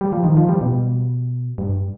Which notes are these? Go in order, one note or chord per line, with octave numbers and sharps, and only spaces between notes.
G3
F3
D#3
F3
G3
B2
G2